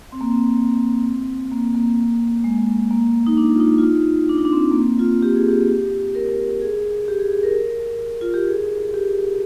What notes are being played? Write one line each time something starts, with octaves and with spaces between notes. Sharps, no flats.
C4
A#3
C4
A#3
A#3
G#3
A#3
D#4
D4
F4
D#4
F4
D#4
D4
D#4
D4
C4
A#3
C4
F4
G4
G#4
G4
A#4
G#4
G4
G#4
G#4
A#4
F4
G4
G#4
G4